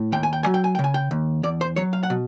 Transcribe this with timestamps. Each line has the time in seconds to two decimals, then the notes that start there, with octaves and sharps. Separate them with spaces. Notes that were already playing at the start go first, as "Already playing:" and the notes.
Already playing: A2
0.12 D#2 G5
0.23 G#5
0.33 G5
0.43 F#3 G#5
0.54 G5
0.64 G#5
0.75 G5
0.79 C#3
0.84 G#5
0.94 G5
1.11 D#2
1.43 E2 D5
1.61 C5
1.76 F#3 C#5
1.93 F5
2.03 F#5
2.10 B2